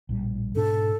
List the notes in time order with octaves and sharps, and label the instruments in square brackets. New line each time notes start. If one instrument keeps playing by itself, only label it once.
[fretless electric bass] A#1 A2 G3
[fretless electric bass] G#2 B2 D4 [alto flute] A4